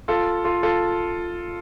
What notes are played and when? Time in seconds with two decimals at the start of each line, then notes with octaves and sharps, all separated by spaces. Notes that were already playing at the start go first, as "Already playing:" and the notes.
0.08 F4 A4
0.45 F4 A4
0.63 F4 A4